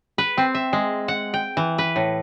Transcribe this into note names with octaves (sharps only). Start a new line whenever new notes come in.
B4
C4
E5
G#3
F#5
G5
E3
B4
A2